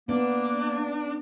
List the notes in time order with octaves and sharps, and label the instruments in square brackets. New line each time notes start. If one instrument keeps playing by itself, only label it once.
[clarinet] A#3 [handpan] B3 [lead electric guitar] D4